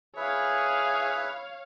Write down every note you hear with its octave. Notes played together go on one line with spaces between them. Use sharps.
E4 G#4 B4 C#5 E5 F5